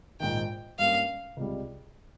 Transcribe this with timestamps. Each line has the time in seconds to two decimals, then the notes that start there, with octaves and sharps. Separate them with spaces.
0.20 A#1 G#2 D#3 G5
0.79 G2 G3 A#3 C#4 F5
1.37 C#2 C3 G3